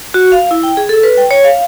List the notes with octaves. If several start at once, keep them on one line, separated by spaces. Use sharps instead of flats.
F#4
F5
E4
G5
G#4
A4
B4
G5
C#5
F5